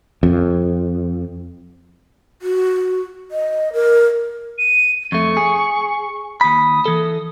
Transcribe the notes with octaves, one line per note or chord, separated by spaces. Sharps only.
F2
F#4
D#5
A#4
D#7
F2 A3 C#6
G#4
D#2 B5 D#6
E3 A4